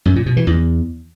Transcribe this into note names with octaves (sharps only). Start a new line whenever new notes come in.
F#2
A#2
B2
E3
E2